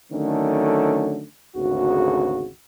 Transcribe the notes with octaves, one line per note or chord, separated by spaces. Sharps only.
D3 D#3 F#3 A3 C#4
G#1 D2 C#3 F#4